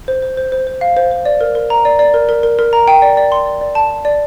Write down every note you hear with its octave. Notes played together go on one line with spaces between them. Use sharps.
C5
C5
C5
C5
C5
F5
C5
C5
D5
A#4
A#4
A#5
D5
D5
A#4
A#4
A#4
A#4
A#5
G5
D5
D5
C6
D5
D5
A5
A5
D5